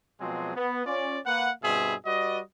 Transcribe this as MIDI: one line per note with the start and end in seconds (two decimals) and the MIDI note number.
0.20 0.53 47
0.20 0.53 53
0.20 0.53 54
0.20 0.53 56
0.20 0.53 60
0.20 0.53 68
0.55 0.85 59
0.86 1.18 61
0.86 1.18 65
0.86 1.18 74
1.25 1.50 58
1.25 1.50 71
1.25 1.50 78
1.62 1.94 43
1.62 1.94 47
1.62 1.94 55
1.62 1.94 60
1.62 1.94 68
1.62 1.94 76
2.05 2.39 55
2.05 2.39 66
2.05 2.39 71
2.05 2.39 74
2.05 2.39 75